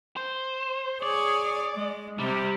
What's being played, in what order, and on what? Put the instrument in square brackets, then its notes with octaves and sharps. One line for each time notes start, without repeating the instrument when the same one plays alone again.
[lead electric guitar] C5
[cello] G#4 C#5 [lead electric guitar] D5
[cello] G#3
[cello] C3 [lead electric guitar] G3